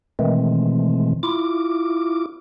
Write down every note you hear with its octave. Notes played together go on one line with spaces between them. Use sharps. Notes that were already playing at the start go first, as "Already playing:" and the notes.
B2 D#3 E3 G#3 A3 C4
E4 F4 D6